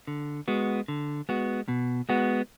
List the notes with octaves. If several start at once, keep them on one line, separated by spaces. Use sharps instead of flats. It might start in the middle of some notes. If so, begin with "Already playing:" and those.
D3
G#3 B3 F#4
D3
G#3 B3 F#4
B2
G#3 B3 F#4